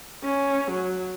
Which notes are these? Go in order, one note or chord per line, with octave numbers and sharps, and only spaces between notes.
C#4
F#3